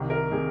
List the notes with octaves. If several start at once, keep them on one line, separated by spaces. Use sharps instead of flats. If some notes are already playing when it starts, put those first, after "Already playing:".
Already playing: C2 C3 D#3
A#4
C3 D#3 G#4